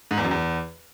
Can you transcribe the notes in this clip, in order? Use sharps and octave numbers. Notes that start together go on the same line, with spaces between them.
G#2
E2
F#2
E2